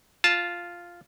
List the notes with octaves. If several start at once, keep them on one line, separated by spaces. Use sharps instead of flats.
F4 A5